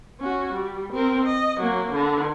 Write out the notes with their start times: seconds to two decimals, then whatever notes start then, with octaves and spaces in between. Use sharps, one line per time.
0.20 C#4 F#4
0.52 G3
0.92 C4 A#4
1.25 D#5
1.60 F#3 A#3
1.91 D3